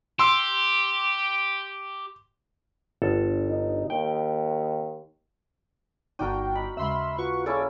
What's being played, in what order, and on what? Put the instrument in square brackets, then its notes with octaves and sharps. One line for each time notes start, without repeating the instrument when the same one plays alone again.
[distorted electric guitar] G4 [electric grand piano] C6 E6
[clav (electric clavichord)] G1 A4
[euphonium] D#4
[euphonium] D#2 [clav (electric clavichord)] G5
[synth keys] G1 G5 [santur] D4 F#4 A#4 [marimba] D#4
[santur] D#4 [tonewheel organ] B5
[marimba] D#2 C#3 G#3 [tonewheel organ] E5 [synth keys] B5 C6 E6
[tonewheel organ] F4 F#4 B4 [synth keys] C#6
[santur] A#3 C#4 E4 [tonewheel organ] G#4 A4 D5